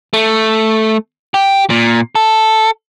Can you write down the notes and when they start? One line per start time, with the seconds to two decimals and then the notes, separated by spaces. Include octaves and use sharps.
0.13 A3
1.34 G4
1.70 A#2
2.15 A4